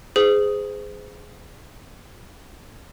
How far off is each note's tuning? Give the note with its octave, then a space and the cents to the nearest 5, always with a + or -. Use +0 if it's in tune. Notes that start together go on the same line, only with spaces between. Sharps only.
G#4 +0 C5 -35